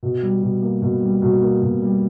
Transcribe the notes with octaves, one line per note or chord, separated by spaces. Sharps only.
B2
G3
B2
A#3
B2
G3
B2
A#3
B2
G3